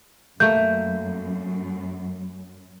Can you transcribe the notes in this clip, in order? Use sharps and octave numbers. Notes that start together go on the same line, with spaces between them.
F#2 A3 A#3 G6